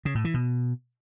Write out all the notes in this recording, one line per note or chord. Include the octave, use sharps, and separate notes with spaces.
C#3
A2
E3
B2